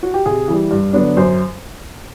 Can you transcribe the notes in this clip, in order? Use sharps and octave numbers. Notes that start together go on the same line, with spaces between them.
F#4
G4
C3 G#4
E3 G3
G2
D3 F#3 B3 D4
F#2 C5